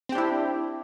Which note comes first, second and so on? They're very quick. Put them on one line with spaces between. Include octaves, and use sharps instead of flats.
C4 G4 D4 E4